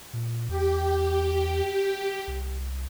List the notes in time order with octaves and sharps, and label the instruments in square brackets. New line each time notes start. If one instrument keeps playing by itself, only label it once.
[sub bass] A#2
[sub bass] E2 [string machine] G4
[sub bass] C2